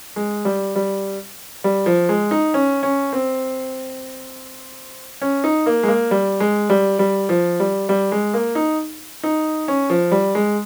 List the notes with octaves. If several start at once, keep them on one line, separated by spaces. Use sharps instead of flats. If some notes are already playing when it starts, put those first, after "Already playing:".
G#3
G3
G3
G3
F3
G#3
D#4
C#4
C#4
C4
C#4
D#4
A#3
G#3
A#3
G3
G#3
G3
G3
F3
G3
G3
G#3
A#3
D#4
D#4
C#4
F3
G3
G#3